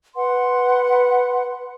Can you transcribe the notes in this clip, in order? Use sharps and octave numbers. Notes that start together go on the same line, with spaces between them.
B4 F#5 C6